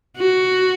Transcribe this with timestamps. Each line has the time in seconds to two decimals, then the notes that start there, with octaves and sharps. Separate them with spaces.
0.18 F#4